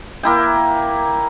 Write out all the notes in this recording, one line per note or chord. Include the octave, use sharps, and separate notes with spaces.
A#3 E4 G5